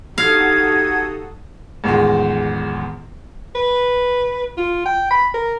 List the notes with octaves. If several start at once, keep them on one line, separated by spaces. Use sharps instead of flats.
D#4 F#4 G4 A4 F5 D#6 G#6
A1 E2 D#3 F3 G#3
B4
F4
G5
B5
A#4